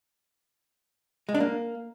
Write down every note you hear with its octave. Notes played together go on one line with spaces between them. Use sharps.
G#3
D4
A#3